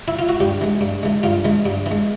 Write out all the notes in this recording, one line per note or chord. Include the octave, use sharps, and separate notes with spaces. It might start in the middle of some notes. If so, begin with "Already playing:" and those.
E4
F4
F#4
G2 G4
E3 G#3
G2
E3 G#3
G2 F4
E3 G#3
G2
E3
G#3